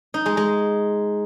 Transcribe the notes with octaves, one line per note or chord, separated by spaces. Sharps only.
D#4
G#3
G#3